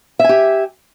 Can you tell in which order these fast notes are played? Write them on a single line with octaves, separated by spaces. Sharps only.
E5 G#5 G4